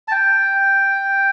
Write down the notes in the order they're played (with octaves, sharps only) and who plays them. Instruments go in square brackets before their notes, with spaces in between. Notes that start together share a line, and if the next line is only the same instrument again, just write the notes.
[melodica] A5
G5